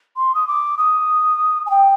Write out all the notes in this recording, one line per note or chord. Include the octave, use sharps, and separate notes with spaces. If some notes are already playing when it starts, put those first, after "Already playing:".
C6
D#6
D6
D#6
G#5
G5